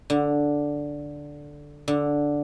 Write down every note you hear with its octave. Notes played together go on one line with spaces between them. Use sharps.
D3
D3